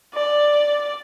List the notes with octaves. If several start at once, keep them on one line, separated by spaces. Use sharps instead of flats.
D5